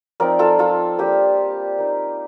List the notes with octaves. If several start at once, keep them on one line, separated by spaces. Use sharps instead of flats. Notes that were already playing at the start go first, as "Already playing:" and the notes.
F3 C4 D#4 A#4 D5
F4 A4
F4 A4
G3 A#3 D4 G4
A#3 D#4